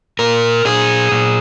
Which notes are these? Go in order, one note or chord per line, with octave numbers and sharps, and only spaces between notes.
A#2 A#4
A#2 G#4
A#2